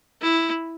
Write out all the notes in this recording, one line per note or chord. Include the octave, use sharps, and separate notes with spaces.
E4